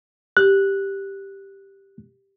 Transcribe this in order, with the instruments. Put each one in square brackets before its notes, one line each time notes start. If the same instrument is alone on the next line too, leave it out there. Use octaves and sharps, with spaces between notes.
[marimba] G4 [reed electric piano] F#6